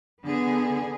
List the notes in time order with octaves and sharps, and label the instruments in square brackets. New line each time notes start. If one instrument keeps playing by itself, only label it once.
[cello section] D3 B3 G#4